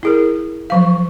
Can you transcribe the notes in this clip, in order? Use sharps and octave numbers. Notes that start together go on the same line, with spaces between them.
E4 G#4 A#4
F3 F#3 F5